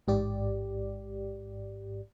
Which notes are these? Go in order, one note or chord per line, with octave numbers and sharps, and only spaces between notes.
A1 G#2 G4 D5